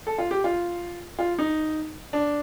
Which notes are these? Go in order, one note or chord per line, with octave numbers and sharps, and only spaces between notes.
A4
F4
G4
F4
F4
D#4
D4